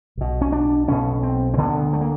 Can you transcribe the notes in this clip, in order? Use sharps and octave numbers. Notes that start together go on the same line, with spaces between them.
B1 B2
C#4
D4
B1 B2 C#4
C4
C4
D2 D3 B3
A3
A#3